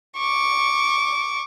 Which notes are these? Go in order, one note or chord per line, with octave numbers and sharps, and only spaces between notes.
C#6 D6